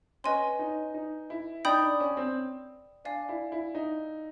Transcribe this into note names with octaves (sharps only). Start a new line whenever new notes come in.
C#4 B4 D#5 G#5 C6
D#4
D#4
E4
D#4 D5 G5 B5 D#6 G6
D4
C#4
C4
D4 D5 F5 G#5
E4
E4
D#4